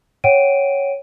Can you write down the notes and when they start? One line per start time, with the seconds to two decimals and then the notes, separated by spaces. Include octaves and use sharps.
0.24 C#5 F#5 G5 D7 D#7